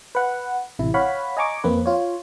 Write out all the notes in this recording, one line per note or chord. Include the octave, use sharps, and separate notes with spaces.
B4 F#5
A1 C3 E4
C#5 F5 F#5 B5
D#5 G#5 A#5 C#6 D6
F2 A#3 C4 B4
F4 C#5